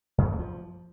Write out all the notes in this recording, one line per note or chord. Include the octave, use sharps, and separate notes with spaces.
F#2
F#3
A3
F3